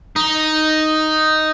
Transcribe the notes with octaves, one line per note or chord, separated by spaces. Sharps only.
D#4